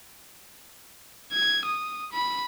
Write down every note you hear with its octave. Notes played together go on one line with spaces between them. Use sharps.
G#6
D#6
B5